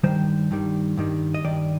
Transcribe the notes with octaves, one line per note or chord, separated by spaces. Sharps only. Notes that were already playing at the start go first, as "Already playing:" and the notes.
G2 D#3 G3 C5
G2 D#3 G3
G2 D#3 G3
D#5
G2 D#3 G3 D5